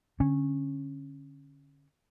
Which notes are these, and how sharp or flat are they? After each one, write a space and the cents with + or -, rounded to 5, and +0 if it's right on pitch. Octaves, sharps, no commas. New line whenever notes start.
D3 -15 C#4 -15